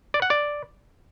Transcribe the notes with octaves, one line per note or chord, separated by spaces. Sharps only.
D5
F#5
D5